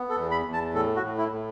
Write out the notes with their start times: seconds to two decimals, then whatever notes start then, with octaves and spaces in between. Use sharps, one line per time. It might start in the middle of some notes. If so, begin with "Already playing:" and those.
Already playing: B3
0.09 A4
0.16 E2
0.31 B5
0.46 E2
0.53 A5
0.74 A2 A4
0.96 F#4
1.03 A2
1.18 E4
1.32 A2